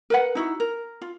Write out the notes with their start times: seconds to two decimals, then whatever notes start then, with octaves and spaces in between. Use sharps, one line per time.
0.10 A#4 B4 F#5
0.35 D#4 E4 F#4
0.60 A#4
1.01 F4